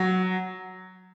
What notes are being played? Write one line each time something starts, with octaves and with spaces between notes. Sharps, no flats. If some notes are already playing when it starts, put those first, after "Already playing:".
Already playing: F#3